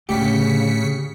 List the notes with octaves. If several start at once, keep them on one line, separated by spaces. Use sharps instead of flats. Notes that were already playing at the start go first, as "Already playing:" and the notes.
D2 A2 C#3 G4 B6 C#7